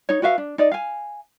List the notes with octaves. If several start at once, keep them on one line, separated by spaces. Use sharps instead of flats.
D#4 C#5
F#4 B4 E5 F5
D4
D#4 D5 D#5
F5 G#5